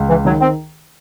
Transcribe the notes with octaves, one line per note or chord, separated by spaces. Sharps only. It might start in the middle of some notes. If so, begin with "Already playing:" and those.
Already playing: C#2
E3
D#3 F#3
C4